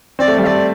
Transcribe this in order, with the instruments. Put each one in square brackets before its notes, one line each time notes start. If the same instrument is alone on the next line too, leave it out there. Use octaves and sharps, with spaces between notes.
[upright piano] C4 [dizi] D5
[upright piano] A3
G3
[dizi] F5
[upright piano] A3 [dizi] D5